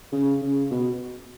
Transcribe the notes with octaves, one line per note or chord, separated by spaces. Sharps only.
C#3
C#3
B2